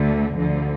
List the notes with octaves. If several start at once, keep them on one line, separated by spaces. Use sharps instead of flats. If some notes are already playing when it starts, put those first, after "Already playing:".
Already playing: D2 D3 A3
D2 D3 F3